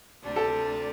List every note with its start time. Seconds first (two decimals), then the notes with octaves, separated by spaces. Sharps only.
0.22 D2 C3 G3 D4
0.36 A4